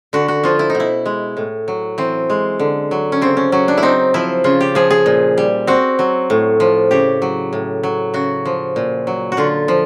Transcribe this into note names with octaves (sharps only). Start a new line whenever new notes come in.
D3 F#4
F#4
F3 F4
E4
D#4
B2
E4
G#3
A2
F#3
E3 C4
G#3
D3
F#3
C#4
C#3 C4
C#4
F#3 C#4
D4
E4
C4 D#4
F3 E4
C#3 F4
G4
F3 G#4
G#4
A#2
G3
C4 F#4
F#3
A2
F3
C#3 G4
F#3
A2
F#3
C#3 F#4
F3
A#2
F#3
F#4
D3 F4
F3